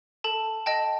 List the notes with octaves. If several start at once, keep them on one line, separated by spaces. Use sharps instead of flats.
A4 A5
D#5 G5 A5